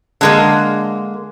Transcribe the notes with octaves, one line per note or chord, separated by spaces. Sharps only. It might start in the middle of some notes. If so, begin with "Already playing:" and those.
D3 G#3 A#3